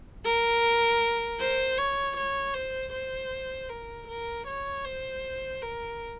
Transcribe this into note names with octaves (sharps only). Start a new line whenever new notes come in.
A#4
C5
C#5
C#5
C5
C5
A#4
A#4
C#5
C5
A#4